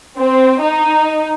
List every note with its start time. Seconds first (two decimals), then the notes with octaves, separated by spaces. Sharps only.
0.18 C4
0.60 D#4